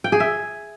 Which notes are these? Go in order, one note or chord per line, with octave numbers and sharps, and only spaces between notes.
G5
G#4
E5